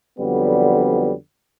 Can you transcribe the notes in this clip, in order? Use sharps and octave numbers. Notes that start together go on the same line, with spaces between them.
F2 D3 F#3 G3 B3